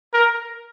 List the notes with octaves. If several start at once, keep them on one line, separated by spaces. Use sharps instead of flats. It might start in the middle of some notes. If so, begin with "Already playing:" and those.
A#4